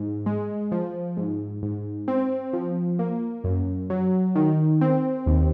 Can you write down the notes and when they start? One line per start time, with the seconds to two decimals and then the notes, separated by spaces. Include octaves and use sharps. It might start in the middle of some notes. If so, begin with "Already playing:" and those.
Already playing: G#2
0.26 G#3
0.72 F3
1.17 G#2
1.63 G#2
2.08 C4
2.53 F3
2.99 A#3
3.44 F#2
3.90 F#3
4.35 D#3
4.81 C4
5.26 D#2